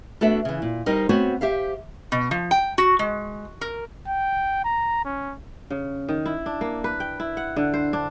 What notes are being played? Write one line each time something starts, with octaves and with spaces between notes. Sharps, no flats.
A3 B3 D4 F#4 A4 E5
C#3 E3
A#2
G3 D#4 A#4 C5 D#5
A3 B3 C4 F#4 C5 C#5
G4 C5 E5 F5
B2
F3
G5
F#4
G#3
A#4
G5
A#5
C#4
C#3
D#3
E4
D4
A#3
B4
G5
E4
F#5
D3
C5
D4